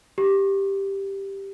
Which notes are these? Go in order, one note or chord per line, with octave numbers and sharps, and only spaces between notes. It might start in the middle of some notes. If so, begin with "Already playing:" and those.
G4